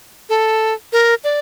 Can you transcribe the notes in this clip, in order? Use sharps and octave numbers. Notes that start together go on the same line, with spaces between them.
A4
A#4
D5